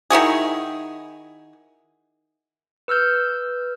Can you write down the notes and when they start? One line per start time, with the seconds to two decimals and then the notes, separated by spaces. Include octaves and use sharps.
0.10 D#3 E4 F#4 G#4
2.88 B4 E6 F6 G6